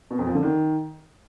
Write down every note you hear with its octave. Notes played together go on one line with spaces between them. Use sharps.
B2
F2
F3
D3
D#3